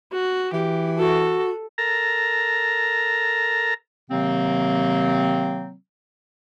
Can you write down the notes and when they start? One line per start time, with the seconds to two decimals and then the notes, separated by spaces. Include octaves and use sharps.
0.12 F#4
0.53 E3 G4
0.98 F#4 A4
1.78 A4 A#4 A#5
4.11 C3 D#3 F#3 A#3 C4